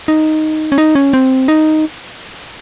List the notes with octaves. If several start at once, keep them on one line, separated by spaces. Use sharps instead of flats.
D#4
C#4
D#4
C#4
C4
D#4